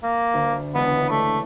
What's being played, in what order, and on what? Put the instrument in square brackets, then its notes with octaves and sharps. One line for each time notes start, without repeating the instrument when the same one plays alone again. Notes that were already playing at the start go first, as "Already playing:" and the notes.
[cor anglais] A#3
[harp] D2
[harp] E1 C#2 [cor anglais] B3
[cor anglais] A3 [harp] D5 B6